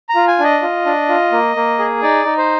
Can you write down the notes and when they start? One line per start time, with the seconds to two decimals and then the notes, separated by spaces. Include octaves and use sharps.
0.09 A#5
0.15 F4
0.28 G#5
0.39 D4 D#5
0.62 F4
0.86 D4
1.09 F4
1.32 A#3
1.56 A#3
1.79 G#4
2.02 D#4 D5
2.25 D#4
2.37 C5